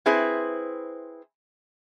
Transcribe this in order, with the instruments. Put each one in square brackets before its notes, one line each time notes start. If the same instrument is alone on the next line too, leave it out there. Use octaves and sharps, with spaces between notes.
[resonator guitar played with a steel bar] C4 E4 G#4 B4 C5